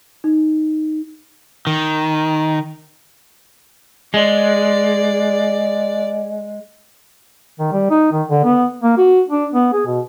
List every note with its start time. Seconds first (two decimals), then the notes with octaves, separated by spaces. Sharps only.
0.24 D#4
1.67 D#3
4.14 G#3 D5
7.59 D#3
7.72 G3
7.90 D#4
8.12 D#3
8.29 D3
8.44 B3
8.82 A#3
8.97 F#4
9.29 D4
9.54 B3
9.73 G#4
9.87 B2